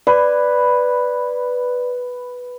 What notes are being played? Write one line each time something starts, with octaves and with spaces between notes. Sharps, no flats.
B4 D5